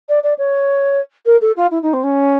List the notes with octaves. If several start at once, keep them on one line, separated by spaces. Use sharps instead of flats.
D5
D5
C#5
A#4
A4
F4
E4
D#4
C4
C#4